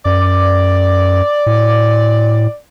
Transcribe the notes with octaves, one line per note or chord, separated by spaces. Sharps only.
F#2 D5
A2